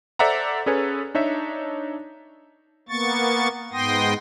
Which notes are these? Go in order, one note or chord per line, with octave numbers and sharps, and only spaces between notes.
A4 C5 D5 E5 F#5 A#5
C#4 G#4 A4 B4 C#5 G#5
D4 D#4 C#5 E5
A#3 B3 C#6 A6
G#2 B3 G5 C6 D#6 A#6